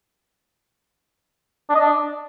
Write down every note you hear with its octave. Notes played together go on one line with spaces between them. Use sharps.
D4
D#5
D4